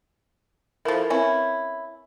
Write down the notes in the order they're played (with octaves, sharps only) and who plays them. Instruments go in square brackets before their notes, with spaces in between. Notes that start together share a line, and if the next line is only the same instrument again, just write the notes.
[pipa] F3 E4 [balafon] A4 A#4
[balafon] C4 B4 [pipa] C#4 E4